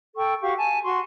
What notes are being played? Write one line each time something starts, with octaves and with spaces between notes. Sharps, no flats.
A4 G5 C#6
F#4 G4 F5 C#6
G#5 A5
F#4 C6 C#6